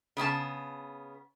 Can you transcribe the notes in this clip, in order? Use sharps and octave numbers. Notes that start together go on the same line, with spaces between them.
C#3 B3 E4 A5